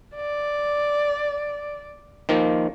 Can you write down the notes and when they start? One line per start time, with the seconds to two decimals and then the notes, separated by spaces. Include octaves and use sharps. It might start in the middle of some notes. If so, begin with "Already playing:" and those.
0.16 D5
2.29 D#3 F3 A#3